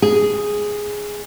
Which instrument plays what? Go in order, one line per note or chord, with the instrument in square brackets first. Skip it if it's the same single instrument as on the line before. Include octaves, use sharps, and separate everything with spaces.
[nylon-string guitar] G#4